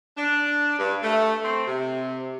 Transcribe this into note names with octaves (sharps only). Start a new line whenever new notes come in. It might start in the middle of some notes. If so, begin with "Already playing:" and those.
D4
G2
A3
C4
C3